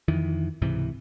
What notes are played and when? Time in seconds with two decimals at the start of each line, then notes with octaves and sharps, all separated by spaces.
0.08 F2 D#3 E3
0.62 C#2 G#2 C3 E3